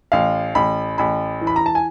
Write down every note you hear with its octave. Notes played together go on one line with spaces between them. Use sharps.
A1 F5
A1 B5
A1 B5
E3
B5
A#5
A5
G#5